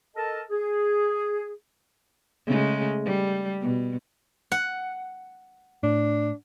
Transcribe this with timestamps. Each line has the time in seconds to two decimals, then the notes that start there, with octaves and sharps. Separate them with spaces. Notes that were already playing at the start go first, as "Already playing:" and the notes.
0.16 A4 A#4 D#5 A5
0.50 G#4
2.47 C#3 G#3 A3
3.05 G3
3.61 B2
4.52 F#5
5.83 A2 D4